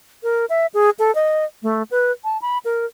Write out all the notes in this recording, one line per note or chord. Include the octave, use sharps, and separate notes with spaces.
A#4
E5
G#4
A4
D#5
A3
B4
A5
B5
A#4